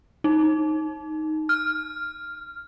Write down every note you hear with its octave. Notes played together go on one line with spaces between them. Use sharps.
D#4
F6